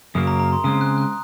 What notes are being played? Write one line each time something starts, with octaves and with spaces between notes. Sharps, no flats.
F#2 C#3 F#3 A#3 D#6
A#5
A#5
C6
C#3 G#3 C4 D#6
F#6
F#6